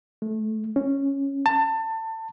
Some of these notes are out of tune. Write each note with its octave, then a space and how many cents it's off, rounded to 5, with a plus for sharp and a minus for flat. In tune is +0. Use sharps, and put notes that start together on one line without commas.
A3 -20
C#4 -5
A5 +25